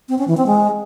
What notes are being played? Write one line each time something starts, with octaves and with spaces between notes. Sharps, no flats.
C4
C#4
E3
C4
G#3